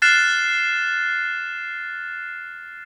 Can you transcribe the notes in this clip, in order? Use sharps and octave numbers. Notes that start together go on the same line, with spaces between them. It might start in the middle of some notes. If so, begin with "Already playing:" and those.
F6 F#6 A6 C7 E7